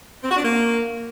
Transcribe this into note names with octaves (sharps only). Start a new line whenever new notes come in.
C4
F#4
D4
A#3